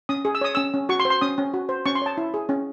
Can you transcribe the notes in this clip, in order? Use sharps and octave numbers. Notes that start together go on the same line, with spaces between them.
C#4 D#6
G#4
E6
C#5 D#6
C#4 E6
C#4
F#4 C#6
C6
C5
C6
C#4 D#6
C#4
F#4
C5
C#4 C#6
C6
C#5 A5
E4
G#4
C#4